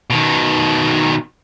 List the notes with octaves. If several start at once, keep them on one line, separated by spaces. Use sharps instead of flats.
B2 D#3